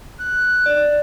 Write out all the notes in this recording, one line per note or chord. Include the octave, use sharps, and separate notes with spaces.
F#6
D5